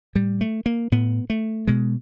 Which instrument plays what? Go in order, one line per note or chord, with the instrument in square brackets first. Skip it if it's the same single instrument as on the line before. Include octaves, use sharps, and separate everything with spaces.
[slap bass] A2 G3
A3
A#3
A2 B3
A3
B2 G#3